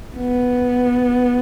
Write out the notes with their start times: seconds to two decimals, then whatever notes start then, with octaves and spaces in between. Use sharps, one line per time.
0.16 B3